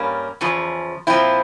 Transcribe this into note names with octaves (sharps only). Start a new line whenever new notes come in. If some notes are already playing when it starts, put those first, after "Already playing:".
Already playing: G2 G3 A#3 C#4
E2 C#3 F3
A#2 F3 C4 E4